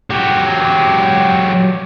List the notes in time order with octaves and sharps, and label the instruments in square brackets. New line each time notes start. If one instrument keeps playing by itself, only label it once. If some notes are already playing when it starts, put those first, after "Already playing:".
[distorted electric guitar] F#3 G4